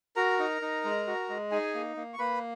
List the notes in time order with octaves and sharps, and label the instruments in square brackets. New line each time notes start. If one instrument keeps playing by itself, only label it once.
[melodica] F#4 A#4 A#5
D#4
D#4
G#3
F#4
G#3
D#4 G#4 G#5
A#3
A#3
C#6
A#3 B4 B5